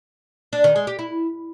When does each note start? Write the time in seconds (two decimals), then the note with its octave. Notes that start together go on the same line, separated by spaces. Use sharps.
0.53 D4
0.64 D#3
0.76 G#3
0.87 G4
0.99 E4